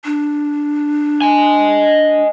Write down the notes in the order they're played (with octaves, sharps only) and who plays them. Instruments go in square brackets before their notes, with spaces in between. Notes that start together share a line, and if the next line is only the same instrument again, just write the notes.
[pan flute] D4
[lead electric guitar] D#5 G#5